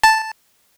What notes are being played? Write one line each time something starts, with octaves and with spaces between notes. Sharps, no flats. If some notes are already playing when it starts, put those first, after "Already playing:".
A5